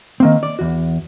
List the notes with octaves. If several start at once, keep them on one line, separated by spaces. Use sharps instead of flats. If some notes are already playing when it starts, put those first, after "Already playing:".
D#3 A#3 C4
D5
E2 F#4